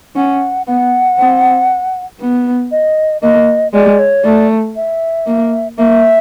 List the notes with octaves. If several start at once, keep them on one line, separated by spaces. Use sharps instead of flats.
C#4 F#5
B3 F#5
C4
B3
D#5
A#3 D#5
G#3 D5
C#5
A3 D5
E5
A#3
A#3 E5